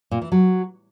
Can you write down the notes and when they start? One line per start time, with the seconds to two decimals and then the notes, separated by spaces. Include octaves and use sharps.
0.11 A#2
0.22 E3
0.32 F#3